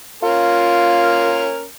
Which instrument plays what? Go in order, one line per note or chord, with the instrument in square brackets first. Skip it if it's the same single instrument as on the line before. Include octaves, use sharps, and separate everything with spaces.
[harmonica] A#3 C#4 A#4 [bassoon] F4